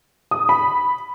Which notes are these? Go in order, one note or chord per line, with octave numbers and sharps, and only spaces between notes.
D#6
B5